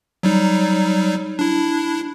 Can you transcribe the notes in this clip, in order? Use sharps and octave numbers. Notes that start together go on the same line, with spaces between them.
F#3 G3 D#4
D4 E4